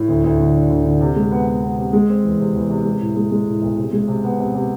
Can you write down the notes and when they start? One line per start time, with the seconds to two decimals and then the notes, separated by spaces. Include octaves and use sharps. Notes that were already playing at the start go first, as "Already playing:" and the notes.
Already playing: A2
0.08 D2
0.24 D2
0.39 D3
0.54 D4
0.70 D2
0.85 D3
1.01 C3
1.16 G#3
1.31 B3
1.47 B3
1.62 B3
1.78 C3
1.93 G#3
2.08 C4
2.24 E2
2.39 C3
2.54 E2
2.70 C3
2.85 G#3
3.00 A2
3.16 G#3
3.31 G#3
3.47 A2
3.62 B1
3.77 C3
3.93 G#3
4.08 C3
4.24 B3
4.39 C3
4.54 C3